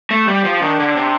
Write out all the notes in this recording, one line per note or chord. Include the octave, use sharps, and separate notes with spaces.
A3
G3 G4
F3
D#3 D4
D3
C3